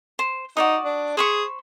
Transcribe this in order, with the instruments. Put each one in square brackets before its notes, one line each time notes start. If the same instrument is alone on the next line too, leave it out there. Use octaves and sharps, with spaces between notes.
[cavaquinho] C5
[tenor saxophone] D#4 [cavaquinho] F#4 D5 D#6
[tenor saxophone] D4
[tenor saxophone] G#4 [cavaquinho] C5 B5 C#6